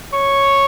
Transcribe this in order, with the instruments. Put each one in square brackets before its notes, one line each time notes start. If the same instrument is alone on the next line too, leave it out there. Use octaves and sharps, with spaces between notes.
[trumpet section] C#5 C#6